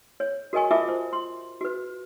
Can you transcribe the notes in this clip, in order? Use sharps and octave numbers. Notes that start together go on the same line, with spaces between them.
C#5
F#4 A#4 D#5 G#5 C#6
F4 A#4 E5 A5 D6
C5
C6
F#4 B4